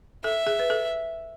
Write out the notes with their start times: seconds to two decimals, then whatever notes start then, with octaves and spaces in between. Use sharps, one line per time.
0.24 A4 E5
0.47 G#4
0.59 B4
0.70 A4